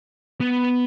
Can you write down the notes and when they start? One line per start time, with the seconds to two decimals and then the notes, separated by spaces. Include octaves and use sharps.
0.41 B3